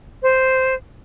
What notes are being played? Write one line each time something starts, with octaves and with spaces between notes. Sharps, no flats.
C5